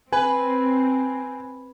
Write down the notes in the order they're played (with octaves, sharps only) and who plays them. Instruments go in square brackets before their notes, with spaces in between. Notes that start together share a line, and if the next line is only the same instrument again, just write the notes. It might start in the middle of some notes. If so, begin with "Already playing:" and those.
[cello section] C4 [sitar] B4 [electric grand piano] G#5